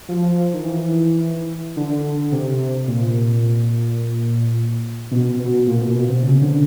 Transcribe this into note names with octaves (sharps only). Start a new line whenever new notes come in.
F3
D#3
E3
D3
C3
A#2
B2
B2
A#2
B2
B2
C3
C#3
D3